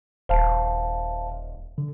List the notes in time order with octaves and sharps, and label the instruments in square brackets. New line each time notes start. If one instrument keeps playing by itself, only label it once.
[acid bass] D#1 [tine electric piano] C5 F5 A5
[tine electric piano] D3